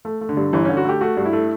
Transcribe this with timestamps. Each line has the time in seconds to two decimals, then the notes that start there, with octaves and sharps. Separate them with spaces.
0.05 A3
0.21 A3
0.29 D3
0.37 G2
0.53 G1 E3
0.65 D3 C#4
0.77 F#4
0.85 A3 G4
1.01 A3 F#4
1.17 G2
1.25 E4
1.33 A3